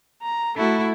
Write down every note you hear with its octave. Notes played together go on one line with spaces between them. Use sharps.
A#5
A3 E4 F#4 A4